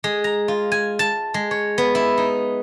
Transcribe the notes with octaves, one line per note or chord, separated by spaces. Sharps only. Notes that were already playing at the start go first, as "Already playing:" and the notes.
G#3
A#5
F4
G#5
A5
G#3
C#5
B3
E4
D#4